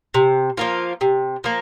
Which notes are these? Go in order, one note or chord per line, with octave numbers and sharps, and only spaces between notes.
C3
F3 A#3 F4
C3
F3 A#3